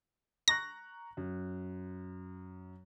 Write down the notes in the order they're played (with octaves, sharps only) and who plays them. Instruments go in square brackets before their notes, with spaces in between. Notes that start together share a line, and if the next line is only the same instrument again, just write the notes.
[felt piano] A#5 C#6 F#6 [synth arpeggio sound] A#6
[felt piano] F#2